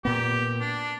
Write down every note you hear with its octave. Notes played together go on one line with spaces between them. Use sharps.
A#2 B3 G4
D4